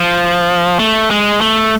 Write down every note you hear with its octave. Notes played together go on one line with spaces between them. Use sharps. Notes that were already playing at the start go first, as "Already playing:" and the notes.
Already playing: F3
A3
G#3
A3